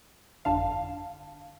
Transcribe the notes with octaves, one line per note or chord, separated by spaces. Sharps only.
G1 F2 D3 F5 A5